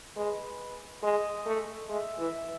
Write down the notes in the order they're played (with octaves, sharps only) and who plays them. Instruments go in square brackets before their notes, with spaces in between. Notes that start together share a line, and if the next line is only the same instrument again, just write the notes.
[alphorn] G#3 [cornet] B4
[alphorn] G#3 [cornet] D#5
[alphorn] A3
[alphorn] G#3 [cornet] E5
[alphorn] E3